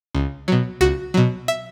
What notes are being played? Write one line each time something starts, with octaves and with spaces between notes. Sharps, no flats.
C#2
B2 F#3
C#2 F#4
B2 F#3
E5